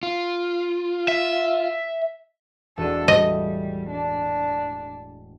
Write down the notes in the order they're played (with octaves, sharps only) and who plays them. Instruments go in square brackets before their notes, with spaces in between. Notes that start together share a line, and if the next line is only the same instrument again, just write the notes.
[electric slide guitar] F4
[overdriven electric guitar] E5
[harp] E1 F#4 D#7 [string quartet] D4 A4
[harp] A2 [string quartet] G3 [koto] D#5
[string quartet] D4